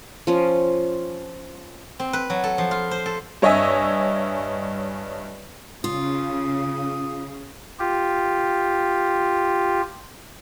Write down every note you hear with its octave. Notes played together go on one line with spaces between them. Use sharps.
F3 C#4
C4
B4
F#3
A4
F3
F4
C5
A4
G2 C#5 D#5 E5 G#5 E6
C#3 F4 D#6
F4 G4